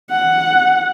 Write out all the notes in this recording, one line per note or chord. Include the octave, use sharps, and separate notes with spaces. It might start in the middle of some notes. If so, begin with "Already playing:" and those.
F#5